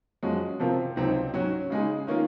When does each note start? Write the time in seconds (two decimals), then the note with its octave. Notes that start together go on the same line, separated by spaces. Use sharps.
0.23 F#2 F3 G#3 C#4 F#4
0.60 C3 F3 C4 F4 A#4
0.96 C#2 C3 F#3 C4 D#4
1.34 G#2 F#3 C#4 F#4
1.70 C#3 G#3 D#4 G#4
2.07 D#3 A#3 C#4 F4 A#4